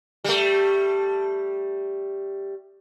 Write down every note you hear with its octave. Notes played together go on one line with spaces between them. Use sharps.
G3 A3